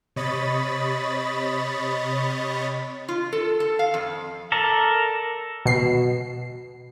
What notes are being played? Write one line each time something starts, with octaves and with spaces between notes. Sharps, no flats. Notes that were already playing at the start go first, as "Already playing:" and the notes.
C3 C#5 D#5 B5 A6
F4
A4
A4
F5
F2
A4 A#4 D5
B2 C7